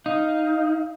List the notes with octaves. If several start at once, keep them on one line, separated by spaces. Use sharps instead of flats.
D#4 F5